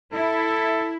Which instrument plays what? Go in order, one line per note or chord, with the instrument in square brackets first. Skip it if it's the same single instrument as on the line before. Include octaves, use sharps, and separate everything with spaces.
[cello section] E4 [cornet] A4